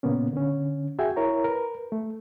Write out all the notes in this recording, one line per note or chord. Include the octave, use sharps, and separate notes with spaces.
A#2 C#3 A#3 B3 C#4
D3 C#4
F#4 G#4 E5 G5 G#5
E4 A#4 C#5 A#5
A#4 B4
A3